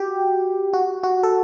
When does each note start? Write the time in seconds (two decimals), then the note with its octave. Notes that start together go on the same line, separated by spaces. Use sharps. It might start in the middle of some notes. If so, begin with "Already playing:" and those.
Already playing: F#4 G4
0.73 F#4
1.03 F#4
1.23 A4